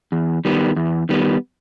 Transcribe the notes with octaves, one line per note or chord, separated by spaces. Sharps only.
E2
D#3 G3 B3
E2
D#3 G3 B3